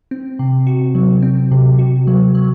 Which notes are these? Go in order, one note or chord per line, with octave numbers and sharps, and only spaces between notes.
C4
C3
F#4
F#3
C4
C3
F#4
F#3
F#3